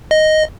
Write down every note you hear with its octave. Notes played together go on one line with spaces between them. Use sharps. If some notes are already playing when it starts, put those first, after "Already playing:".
D#5